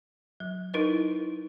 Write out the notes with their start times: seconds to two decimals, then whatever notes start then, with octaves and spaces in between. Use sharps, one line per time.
0.40 F#3
0.74 D#4 E4 A#4 B4 D#5